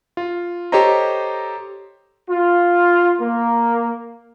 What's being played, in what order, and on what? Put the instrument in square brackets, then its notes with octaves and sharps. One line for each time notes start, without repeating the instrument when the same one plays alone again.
[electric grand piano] F4
G4 A4 C5 C#5 D#5 A#5
[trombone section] F4
A#3